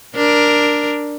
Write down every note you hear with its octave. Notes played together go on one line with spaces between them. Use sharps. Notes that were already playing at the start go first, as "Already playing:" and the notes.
D4 A#4